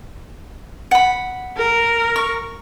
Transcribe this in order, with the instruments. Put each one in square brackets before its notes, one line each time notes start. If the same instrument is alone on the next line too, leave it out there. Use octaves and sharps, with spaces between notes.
[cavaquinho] F#5 B5
[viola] A#4
[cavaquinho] C#6